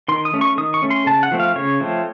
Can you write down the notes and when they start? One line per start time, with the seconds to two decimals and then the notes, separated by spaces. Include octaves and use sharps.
0.08 D#3 C6
0.25 D#6
0.33 A3 C#4
0.41 C#6
0.58 D#3 D#6
0.74 C#6
0.82 A3 C#4
0.90 C6
1.06 C#3 A5
1.23 F#5
1.31 F3 A3 C4
1.40 F5
1.56 C#3 C#5
1.80 F3 A3 C4